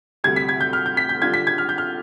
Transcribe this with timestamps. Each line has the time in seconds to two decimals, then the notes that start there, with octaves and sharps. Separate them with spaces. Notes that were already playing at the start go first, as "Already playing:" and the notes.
0.24 D2 C3 G3 G#6
0.36 B6
0.49 G#6
0.61 G6
0.73 F6
0.86 G6
0.97 B6
1.09 G6
1.22 D3 G3 D4 F4 G#6
1.34 B6
1.47 G#6
1.58 F6
1.69 G6
1.78 F6